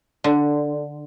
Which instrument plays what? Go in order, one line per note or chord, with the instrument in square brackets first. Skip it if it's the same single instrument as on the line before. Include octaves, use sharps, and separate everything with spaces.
[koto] D3